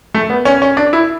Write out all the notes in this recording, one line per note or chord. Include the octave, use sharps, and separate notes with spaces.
A3
B3
C#4
C#4
D4
E4